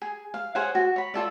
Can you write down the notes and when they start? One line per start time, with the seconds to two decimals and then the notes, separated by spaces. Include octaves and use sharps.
0.02 G#4
0.34 F5
0.55 G#4 C5 C#5 F#5
0.75 F#4
0.96 C#5 B5
1.14 F4 A4 D5